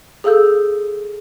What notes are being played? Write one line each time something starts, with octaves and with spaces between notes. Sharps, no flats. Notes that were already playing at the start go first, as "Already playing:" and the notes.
G#4 A4 F5 E6 G6